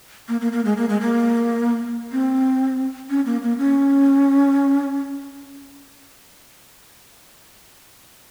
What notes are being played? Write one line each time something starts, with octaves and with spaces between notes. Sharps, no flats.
A#3
A#3
A#3
G#3
A#3
G#3
A#3
C4
C#4
A#3
A#3
C#4